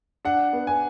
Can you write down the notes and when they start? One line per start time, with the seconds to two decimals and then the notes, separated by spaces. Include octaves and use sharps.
0.25 D4 F#5
0.53 B3
0.67 G#5